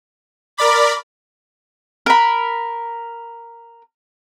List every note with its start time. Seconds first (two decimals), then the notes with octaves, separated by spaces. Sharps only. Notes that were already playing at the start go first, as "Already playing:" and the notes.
0.58 A#4 D5 B5 D6
2.06 A#4 B5